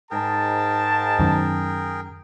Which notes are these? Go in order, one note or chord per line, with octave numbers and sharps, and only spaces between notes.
G#2 G#4 A#4 G5 A5
F#2 D#3